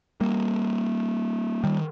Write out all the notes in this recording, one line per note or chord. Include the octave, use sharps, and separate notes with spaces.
G3 A#3
D#3 G3